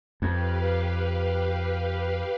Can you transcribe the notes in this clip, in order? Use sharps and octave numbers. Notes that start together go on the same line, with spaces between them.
F2 G4 B4 F5